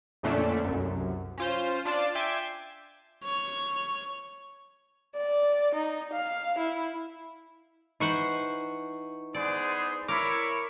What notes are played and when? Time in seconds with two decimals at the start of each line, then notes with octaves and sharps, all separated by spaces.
0.23 F2 A#2 D3 A3 C#4 D4
0.65 C2 F#2
1.38 C#4 F4 C5
1.85 D4 F4 D5 A5
2.15 E5 G5 G#5 C6 D6
3.24 C#5
5.16 D5
5.75 D#4
6.13 F5
6.58 E4
8.00 E3 D#4 C5 F#5 C#6
9.34 B3 G#4 C5 D5
10.09 E4 A#4 C#5 D6